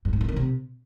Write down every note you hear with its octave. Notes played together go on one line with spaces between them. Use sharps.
G2
G#2
E3
D#3
C3